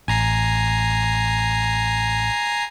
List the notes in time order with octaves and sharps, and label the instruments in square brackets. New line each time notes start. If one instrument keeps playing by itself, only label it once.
[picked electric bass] A1 [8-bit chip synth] G#5 A#5 C7